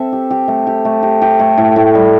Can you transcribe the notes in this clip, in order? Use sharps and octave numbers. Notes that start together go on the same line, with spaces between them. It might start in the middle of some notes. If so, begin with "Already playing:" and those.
Already playing: C4 A4 E5
G4
G4
A3
G4
A3
G4
G4
A3
A2
A2
G3